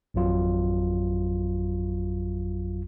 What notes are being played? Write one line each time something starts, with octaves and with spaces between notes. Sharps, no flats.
G#1 F2 F#3 F4